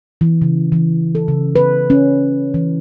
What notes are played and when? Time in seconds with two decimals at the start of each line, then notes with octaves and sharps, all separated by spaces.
0.21 E3
0.42 C#3
0.72 E3
1.15 A4
1.28 C#3
1.56 B4
1.90 C#4
2.54 E3